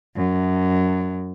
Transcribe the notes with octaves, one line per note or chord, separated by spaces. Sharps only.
F#2